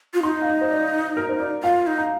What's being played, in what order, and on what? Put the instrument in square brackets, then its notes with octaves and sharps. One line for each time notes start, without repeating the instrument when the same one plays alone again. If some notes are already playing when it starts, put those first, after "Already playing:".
[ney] F4
[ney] D#4 [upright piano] C6
[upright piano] F5
D#5
C5
D5
A#4
C5
D5
[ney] F4 [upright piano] F5
[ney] D#4
[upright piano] A#5